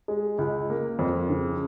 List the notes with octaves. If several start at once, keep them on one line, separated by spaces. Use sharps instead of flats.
G#3
C#2
A#3
F2
C#3